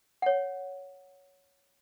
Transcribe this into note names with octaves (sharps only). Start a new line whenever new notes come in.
C#5 F#5